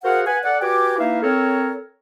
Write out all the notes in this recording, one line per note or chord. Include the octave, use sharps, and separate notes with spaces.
F#4 G#4 A#4 C5 F5 F#5
B4 F#5 G#5
A4 D5 F#5
F#4 G4 B4 G5 G#5 D6
A#3 D#4 E4 B4 E5 F5
C4 A4 A#4 C#5